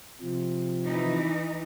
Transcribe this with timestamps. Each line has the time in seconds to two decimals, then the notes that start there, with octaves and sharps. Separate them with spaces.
0.21 C3 F3
0.85 E3 D#4